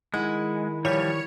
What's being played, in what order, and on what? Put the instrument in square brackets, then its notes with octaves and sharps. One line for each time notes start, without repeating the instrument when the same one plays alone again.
[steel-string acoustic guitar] D#3 E4 F#5 [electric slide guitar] G#3
[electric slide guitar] E3 F3 G3 [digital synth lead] C#5